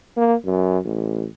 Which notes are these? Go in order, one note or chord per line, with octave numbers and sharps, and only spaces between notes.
A#3
F#2
A1